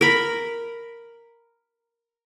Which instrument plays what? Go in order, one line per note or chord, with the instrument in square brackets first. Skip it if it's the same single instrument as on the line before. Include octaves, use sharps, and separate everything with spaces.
[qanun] A#4 B5